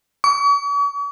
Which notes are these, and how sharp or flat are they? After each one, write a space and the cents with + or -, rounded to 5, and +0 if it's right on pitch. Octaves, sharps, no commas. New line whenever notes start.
C#6 +45